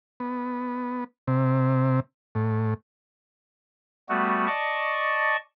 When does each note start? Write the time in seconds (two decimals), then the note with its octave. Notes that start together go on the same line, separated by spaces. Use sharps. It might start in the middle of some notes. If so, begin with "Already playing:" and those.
0.20 B3
1.28 C3
2.35 A2
4.09 G3 A3 B3 F#4
4.47 D5 D#5 A5 C#6